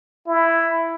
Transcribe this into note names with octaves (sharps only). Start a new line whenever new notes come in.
E4